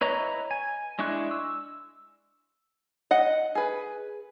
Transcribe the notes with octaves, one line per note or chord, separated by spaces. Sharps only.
E4 B4 C#5 D#5 A#5
G#5
G#3 D4 E4 C#6 F#6
E6
D#5 F#5
G#4 B4